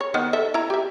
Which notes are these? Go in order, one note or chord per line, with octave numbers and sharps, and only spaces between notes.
C#5
D#3 B3 C5
A4 E5
E4 A#5
G4 E5